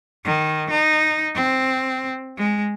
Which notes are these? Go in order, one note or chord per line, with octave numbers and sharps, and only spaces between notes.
D#3
D#4
C4
G#3